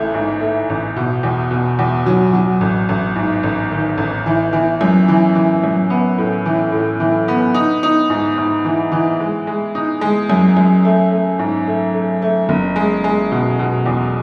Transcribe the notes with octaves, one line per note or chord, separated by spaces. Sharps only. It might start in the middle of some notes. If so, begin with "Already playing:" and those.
Already playing: A1 E3 A3
G#2
A3
A1
B2
E2
B2
E2
F#3
F#3
A1
A1
G#2
A1
D#3
A1
E3
E3
F#2
E3
E3
F#2
B3
A2
E3
A2
E3
B3
D#4
D#4
G#2
G#2
E3
E3
G#3
G#3
D#4
G#3
F#2
F#2
A3
A3
G#2
A3
A3
A3
F#1
G#3
G#3
B2
B2
E2